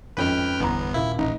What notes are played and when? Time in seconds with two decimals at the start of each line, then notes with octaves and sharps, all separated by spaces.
0.17 G#1 F2 C#4 B4 G5 F6
0.60 G1 E2 B3 A#5
0.94 D#1 E4 F5
1.19 A1 D#4